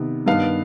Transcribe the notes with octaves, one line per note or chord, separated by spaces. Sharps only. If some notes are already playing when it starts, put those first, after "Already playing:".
Already playing: C3 D#3 B3
G2 D#3 B3 F5